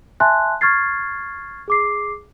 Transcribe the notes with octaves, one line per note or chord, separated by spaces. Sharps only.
E5 G#5 A5 C6 F#6
C#6 F6 G#6 A6 C7
G#4 D6 C7